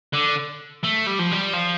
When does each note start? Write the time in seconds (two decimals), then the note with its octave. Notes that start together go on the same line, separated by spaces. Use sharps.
0.13 D3
0.83 A3
1.06 G3
1.19 F3
1.32 G3
1.53 F3